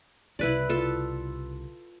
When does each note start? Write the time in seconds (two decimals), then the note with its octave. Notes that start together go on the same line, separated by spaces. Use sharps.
0.39 C2 C#3 E4 B4 D5
0.69 F4 A4